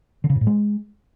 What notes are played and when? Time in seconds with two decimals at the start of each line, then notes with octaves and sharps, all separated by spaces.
0.24 D3
0.30 C#3
0.35 G#2
0.41 A2
0.47 G#3